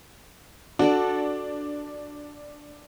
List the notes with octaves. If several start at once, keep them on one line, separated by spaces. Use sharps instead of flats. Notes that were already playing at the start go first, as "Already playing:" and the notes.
D4 F#4 A4 D5